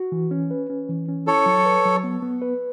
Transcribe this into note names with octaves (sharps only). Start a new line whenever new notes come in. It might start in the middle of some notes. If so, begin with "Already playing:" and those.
Already playing: F#4
E3
C#4
B4
C#4
E3
C#4
E4 A4 C#5
F#3
B4
F#3
B3
B3
B4